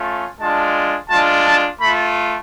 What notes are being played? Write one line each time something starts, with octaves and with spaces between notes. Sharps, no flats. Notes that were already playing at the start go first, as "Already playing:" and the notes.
Already playing: A3 C#4 F4
G#3 D4 F4 A5
G#3 D4 F4 A5
A5
A3 F4 B5